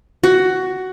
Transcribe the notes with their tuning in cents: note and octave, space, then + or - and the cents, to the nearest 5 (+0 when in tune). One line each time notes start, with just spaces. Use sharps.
F#4 +10